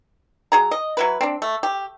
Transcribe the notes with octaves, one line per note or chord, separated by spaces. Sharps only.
F#3 G#4 A#5
D#5
F#3 E4 B4
C4 D4
A3
G4